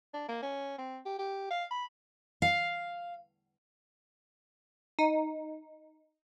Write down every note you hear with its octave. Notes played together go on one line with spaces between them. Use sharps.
D4
A#3
C#4
C4
G4
G4
F5
B5
F5
D#4